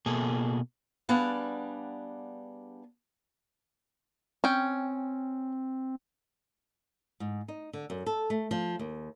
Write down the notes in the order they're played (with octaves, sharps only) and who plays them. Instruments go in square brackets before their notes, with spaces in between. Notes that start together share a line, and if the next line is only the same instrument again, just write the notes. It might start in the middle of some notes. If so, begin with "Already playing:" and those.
[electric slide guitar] B2 A#3 G#4 A4
[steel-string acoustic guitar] G3 B3 D4 G#4 F5 F#5
[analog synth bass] C4 [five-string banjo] C#4 G5
[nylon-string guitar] G#2
D#4
D3
F#2
A4
A3
F3
D#2